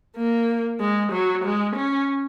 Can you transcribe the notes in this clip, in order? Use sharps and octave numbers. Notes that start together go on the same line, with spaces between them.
A#3
G#3
F#3
G#3
C#4